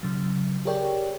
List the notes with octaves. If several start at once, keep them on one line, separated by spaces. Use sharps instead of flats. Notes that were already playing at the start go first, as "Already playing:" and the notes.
C#3 F#3
G4 G#4 A#4 C#5 D5 G5